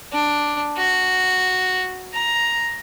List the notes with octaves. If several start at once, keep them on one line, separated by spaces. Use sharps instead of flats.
D4
F#4
A#5